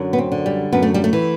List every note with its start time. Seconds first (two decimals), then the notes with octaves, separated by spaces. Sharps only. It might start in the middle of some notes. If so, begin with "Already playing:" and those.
Already playing: F#2 D3
0.13 B3
0.18 C4
0.32 D3
0.46 G3
0.73 F#2 B3
0.83 A3
0.94 G3
1.04 A3
1.13 E3